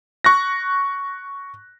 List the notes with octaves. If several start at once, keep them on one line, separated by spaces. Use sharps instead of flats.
C#6 F#6 A#6